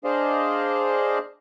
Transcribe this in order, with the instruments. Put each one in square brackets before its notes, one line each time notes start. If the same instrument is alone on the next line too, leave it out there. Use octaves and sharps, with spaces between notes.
[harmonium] D4 G#4 C5 D5 D#5 F5